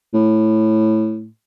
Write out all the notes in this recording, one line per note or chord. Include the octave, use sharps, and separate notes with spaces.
A2